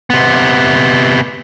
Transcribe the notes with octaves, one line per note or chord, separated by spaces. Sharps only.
C3 B3